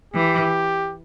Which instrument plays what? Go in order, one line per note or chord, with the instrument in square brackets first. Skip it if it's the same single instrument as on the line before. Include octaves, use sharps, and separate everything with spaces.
[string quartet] E3 [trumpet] G4